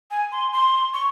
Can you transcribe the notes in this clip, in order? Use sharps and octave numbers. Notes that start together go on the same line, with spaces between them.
G#5
C6
C6
C#6